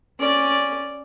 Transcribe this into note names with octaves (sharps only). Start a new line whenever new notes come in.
C#4 D5